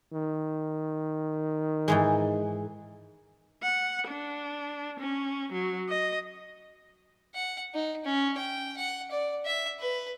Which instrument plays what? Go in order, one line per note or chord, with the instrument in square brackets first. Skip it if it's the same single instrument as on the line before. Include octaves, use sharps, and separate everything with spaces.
[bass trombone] D#3
[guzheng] G#2 E3 G#3
[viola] F#5
D4
C#4
F#3
D#5
[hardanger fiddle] F#5
D#4
C#4
G5
F#5
D5
E5
B4